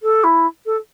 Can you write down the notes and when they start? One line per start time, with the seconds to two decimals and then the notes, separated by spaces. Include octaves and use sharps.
0.02 A4
0.23 E4
0.65 A4